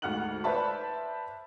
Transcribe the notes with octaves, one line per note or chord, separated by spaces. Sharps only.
D2 G#2 F#5 F6 F#6 F#7
B4 C5 D5 E5 A5 B5